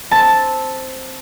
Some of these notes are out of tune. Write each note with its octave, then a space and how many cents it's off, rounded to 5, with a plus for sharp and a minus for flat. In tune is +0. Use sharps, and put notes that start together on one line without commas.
C4 +0 A5 +0